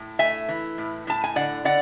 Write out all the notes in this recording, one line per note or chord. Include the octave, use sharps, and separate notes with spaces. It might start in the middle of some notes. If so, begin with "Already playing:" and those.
Already playing: A2
A3 E5 G#5
E3
A2
A2 A5
G#5
D3 D5 F#5
D3 D5 F#5